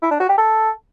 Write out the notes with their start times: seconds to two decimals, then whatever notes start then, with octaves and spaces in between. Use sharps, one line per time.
0.02 E4
0.11 D4
0.20 F#4
0.29 G4
0.38 A4